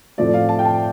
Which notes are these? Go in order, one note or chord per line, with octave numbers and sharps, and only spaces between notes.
A2 F3 A3 C4 D5
F5
A5
G5
A5